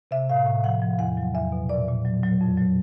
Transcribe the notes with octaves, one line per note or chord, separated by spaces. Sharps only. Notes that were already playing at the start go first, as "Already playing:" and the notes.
C3 E5
A2 F5
A2
F3 F#5
F3
E2 F#5
F#3
E2 E5
B2
A#2 D5
A#2
F#3
F#3
F2
F#3